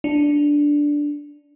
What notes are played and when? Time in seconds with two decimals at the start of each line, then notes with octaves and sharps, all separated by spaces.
0.04 D4